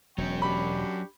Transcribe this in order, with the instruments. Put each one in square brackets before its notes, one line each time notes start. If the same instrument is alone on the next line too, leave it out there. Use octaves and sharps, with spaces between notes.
[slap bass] E1 [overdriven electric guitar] F#3 C#4 [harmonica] G5 C#6
[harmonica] D4 G4 C#6 [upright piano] B5